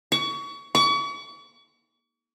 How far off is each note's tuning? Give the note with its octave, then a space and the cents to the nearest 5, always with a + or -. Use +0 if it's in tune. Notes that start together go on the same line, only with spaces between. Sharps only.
C#6 +30
C#6 +40